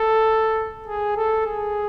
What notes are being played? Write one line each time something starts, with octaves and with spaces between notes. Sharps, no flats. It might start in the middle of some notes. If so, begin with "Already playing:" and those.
Already playing: A4
G#4
A4
G#4